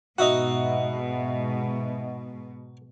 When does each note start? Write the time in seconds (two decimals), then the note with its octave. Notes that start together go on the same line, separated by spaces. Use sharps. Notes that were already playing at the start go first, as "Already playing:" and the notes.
0.18 G#2 B2 D#4 F#4 D#5 E5 F#5